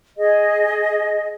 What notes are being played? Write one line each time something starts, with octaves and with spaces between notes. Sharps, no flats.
G#4 D#5